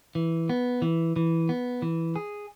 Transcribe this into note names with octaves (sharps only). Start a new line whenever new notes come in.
E3
B3
E3
E3
B3
E3
G#4